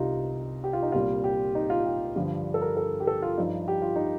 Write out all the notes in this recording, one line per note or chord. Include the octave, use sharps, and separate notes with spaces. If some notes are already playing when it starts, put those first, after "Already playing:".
Already playing: C2 C3 G3 D#4 F4
G4
F4
D#4
C2 A#2 G3 F4
G4
D#4
F4
G4
G2 D3 F3
A4
A#4
A4
G4
A4
F4
G2 F3 D#4
G4
F4
D#4